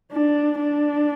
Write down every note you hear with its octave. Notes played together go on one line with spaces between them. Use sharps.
D4
D4